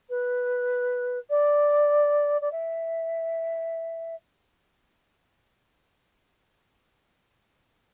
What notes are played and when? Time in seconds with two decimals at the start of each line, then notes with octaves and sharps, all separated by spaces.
0.09 B4
1.30 D5
2.41 D5
2.51 E5